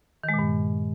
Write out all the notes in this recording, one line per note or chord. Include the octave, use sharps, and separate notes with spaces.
D#3
G#3
A#2
G2